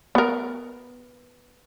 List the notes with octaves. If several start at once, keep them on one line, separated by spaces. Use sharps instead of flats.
B3 A#4